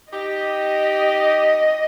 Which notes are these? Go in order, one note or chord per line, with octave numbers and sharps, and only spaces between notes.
D#4 G4 D#5